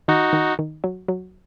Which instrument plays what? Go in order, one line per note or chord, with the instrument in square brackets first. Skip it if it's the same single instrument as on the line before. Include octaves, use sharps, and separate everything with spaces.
[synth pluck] D#3 [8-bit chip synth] D#4 F#4
[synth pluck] D#3
D#3
F#3
F#3